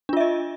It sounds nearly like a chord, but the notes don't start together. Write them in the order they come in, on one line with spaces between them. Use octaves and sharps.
D4 F4 E5 D#5